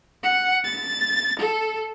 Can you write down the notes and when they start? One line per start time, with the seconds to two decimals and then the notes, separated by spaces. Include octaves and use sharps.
0.23 F#5
0.64 A6
1.40 A4